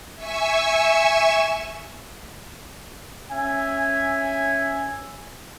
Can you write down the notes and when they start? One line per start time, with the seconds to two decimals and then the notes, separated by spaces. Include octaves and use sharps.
0.15 E5 G#5 C#6 E6
3.30 C#4 E5 G#5